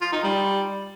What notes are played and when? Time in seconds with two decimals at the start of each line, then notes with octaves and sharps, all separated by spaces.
0.01 F4
0.12 D#4
0.23 G3